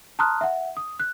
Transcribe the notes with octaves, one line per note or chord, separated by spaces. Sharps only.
A5 A#5 C6 D#6 F6 F#6
E5 F#5
D#6
F#6